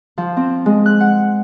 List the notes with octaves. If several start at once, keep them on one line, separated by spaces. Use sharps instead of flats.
F3
C4
G#3
F#6
F#5